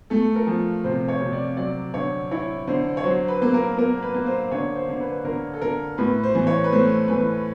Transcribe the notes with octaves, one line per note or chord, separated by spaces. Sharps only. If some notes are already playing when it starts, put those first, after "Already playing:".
A3 A4
A#4
F3
C3 C5
C#5
C3
D5
F#3 D5
D3 C#5
E4 C#5
D3 C5
C#5
F#3 C5
B4
A#3
A#4
A#3 A#4
B4
A#3
C5
D3 C#5
C5
D3
B4
D3 A#4
A4
D3 A#4
A2 B4
C5
E3
C#5
B4
A3 C5
E3 B4